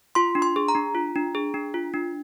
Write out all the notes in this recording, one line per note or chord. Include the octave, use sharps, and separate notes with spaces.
F4 C6
D4
C6
G#4
A#5
D4
F4
D4
G#4
D4
F4
D4